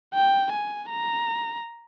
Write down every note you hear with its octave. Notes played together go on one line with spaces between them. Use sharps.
G5
G#5
A#5